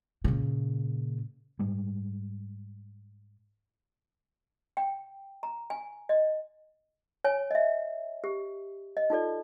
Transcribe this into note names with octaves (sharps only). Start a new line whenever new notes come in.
A#2 C#3
G#2 G3 G#3
G5
A#5
G#5
D#5
C#5 G#5
D#5 E5
G4
D#5
D#4 F4 A4 D5